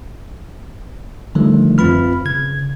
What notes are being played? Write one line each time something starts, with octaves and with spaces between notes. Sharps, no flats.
D3 D#3 F3 G3 A3
F#2 C4 F4 B4 B5 F6
C#3 G#6